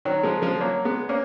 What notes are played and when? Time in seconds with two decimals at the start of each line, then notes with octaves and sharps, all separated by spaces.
0.05 D#3 F#3
0.23 F3 G#3
0.42 F3 G#3
0.61 F#3 A#3
0.85 G#3 B3
1.09 A#3 C#4